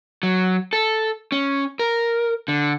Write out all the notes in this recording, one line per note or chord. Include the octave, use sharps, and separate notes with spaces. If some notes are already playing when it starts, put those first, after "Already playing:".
F#3
A4
C#4
A#4
D3